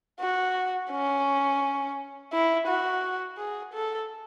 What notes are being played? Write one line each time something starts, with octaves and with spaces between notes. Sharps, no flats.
F#4
C#4
E4
F#4
G#4
A4